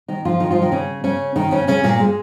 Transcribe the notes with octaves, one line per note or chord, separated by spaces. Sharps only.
D#3 D#4
F3 F4
D#3 D#4
F3 F4
D#3 D#4
C#3 C#4
C#3 C#4
D#3 D#4
C#3 C#4
C#3 C#4
A#2 A#3
G#3